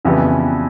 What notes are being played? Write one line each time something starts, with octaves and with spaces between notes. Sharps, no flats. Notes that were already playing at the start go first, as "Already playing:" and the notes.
F2 C#3 E3 G3 B3